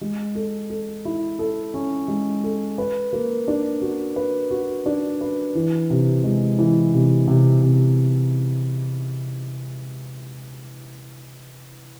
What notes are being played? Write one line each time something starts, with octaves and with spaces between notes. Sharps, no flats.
G#3
A4
A4
E4
A4
C#4
G#3
A4
B4
A#3
D4
F#4
B4
F#4
D4
B4
E3
C3
G#3
E3
C3
C3
C3